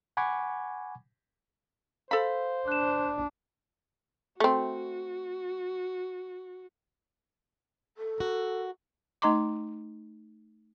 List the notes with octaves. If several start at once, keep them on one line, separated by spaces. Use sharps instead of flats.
F#5 G#5 B5 C#6 D6 G#6
A4 C5 F5 B5
D4 F#6 E7
A3 C4 F#4
A4
F#4 A#4
A3 D#4 D#5 A#5 C6 D6